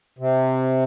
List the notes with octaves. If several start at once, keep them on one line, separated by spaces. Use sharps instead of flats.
C3